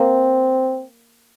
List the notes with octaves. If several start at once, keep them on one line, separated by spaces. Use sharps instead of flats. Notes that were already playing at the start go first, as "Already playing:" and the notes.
Already playing: A#3 C4